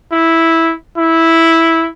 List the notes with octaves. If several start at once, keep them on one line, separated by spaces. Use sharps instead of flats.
E4
E4